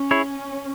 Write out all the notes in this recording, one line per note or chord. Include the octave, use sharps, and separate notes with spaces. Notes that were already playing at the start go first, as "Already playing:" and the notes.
Already playing: C#4
E4 G#4 C#5